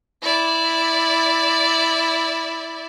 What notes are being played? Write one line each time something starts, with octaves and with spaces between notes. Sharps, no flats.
E4 D5